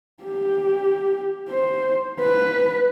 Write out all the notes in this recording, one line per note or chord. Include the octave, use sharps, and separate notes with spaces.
G4
C5
B4